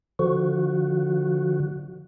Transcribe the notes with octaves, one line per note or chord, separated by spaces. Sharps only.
D3 F3 F#4